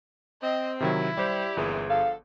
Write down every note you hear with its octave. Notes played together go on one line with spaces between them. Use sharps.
C4 D#5
C3 D#3 F#3 E4
G3 G4 C5 D5
G1 F2 A#2 E3 G#4
D3 F3 A4 F5